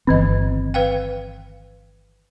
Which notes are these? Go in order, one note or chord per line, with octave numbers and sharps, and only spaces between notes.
G1 D#3 E3 C4 D#5
B4 F5 G5